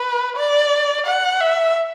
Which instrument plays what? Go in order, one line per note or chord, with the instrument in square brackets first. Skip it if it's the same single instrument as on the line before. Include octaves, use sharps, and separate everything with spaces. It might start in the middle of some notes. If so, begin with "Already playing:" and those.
Already playing: [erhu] B4
D5
F#5
E5